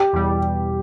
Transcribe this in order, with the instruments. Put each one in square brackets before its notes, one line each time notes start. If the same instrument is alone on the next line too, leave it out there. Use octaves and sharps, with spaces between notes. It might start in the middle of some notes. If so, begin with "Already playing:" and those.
Already playing: [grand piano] G4
[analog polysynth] E2 B2 G3